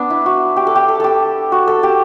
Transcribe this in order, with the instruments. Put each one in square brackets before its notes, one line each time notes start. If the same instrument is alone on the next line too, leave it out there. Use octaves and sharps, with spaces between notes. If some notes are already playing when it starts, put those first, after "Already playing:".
Already playing: [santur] B3 D4
E4
F#4
G4
A4
G4
A4
G4 A4
F#4
A4
G4